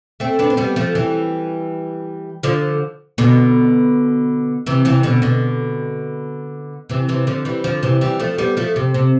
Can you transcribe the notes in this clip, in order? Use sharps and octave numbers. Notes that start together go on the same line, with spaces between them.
A3 C4
B3 D4
C4
G3 B3
F3 A3
E3 G3
D3 F3
B2 D3
C3 E3
C3 E3
B2 D3
B2 D3
C3 E3
C3 E3
D3 F3
E3 G3
D3 F3
C3 E3
E3 G3
F3 A3
G3 B3
F3 A3
C3
C3